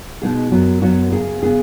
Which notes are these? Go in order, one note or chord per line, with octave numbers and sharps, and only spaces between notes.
B2 G#3 B3 D#4 G#4
F#2 F#3 B3 F#4
F#2 F#3 B3 F#4
C#3 B3 G#4
C#3 B3 G#4